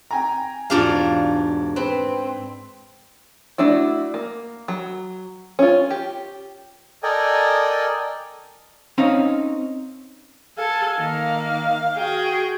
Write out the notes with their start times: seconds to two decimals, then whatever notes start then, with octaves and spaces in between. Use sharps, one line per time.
0.11 G5 G#5 A#5
0.70 E1 G#2 D4 F4 G4 F5
1.76 C4 B4
3.58 A3 D4 E4 F#4
4.14 A#3
4.68 F#3
5.59 C#4 F4
5.91 G4
7.03 A4 A#4 D5 D#5 G5 G#5
8.98 C4 C#4 D#4 F5
10.58 A4 F5 G#5 A5
10.98 D#3 A#3
11.95 F#4 G#4 G5